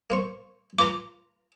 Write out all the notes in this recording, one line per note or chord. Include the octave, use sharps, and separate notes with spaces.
A#3 C5 C#6
F4 B4 A#5 D6